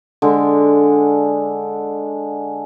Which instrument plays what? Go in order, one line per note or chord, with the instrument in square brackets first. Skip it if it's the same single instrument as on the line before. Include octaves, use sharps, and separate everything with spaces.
[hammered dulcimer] D3 G#3